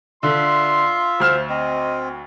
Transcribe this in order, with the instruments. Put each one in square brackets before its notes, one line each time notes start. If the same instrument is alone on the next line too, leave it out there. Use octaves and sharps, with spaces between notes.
[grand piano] D3 [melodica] F4 E5 [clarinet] C6
[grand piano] D2 F6 E7 [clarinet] C5
[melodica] C4 [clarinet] D#5